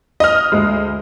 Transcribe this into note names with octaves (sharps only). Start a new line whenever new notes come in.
D#5 F6
D2 G#3